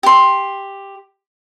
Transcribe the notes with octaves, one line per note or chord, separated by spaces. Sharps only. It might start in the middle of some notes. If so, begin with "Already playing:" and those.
G4 C6